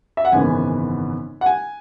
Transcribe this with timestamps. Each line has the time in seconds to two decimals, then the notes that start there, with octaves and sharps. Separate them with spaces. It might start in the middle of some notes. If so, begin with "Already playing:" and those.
0.17 E5
0.25 F#5
0.32 G#1 F#2 C#3 E3 B3 G#5
1.41 F#5
1.46 G#5